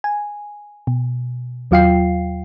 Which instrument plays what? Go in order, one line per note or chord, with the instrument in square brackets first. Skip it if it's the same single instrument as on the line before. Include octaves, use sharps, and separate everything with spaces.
[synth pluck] G#5
B2
D#2 F#3 F4 F5 G5 C7